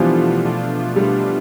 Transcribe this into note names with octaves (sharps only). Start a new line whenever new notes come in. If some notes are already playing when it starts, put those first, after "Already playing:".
Already playing: B2 E3 F3 G3 A3 B3 D4 F4
B2 A3 D4 F4
B2 G3 A3 D4 F4